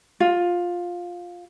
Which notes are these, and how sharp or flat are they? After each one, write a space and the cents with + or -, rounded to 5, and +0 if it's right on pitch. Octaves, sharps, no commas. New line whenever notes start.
F4 +10